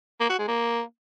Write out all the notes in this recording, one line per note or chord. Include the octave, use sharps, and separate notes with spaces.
A#3
F#4
G#3
A#3